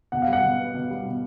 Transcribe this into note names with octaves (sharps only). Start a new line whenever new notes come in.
B2 F#5
F5
G3
F#5
B2
B3
B2
G3
B2